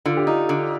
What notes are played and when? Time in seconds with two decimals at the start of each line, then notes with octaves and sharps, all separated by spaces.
0.06 D3 F4
0.17 G4
0.27 D#4 F4
0.49 D3